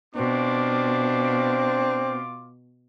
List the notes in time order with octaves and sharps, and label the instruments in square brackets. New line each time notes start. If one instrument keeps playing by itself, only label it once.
[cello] B2 [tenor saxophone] C4 [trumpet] D4 [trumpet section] F4 D6